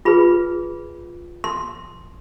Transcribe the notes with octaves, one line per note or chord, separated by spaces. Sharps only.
F4 G#4 B4 B5
C6